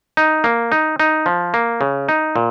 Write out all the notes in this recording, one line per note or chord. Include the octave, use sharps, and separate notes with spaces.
D#4
A#3
D#4
D#4
F3
A#3
C#3
D#4
A#2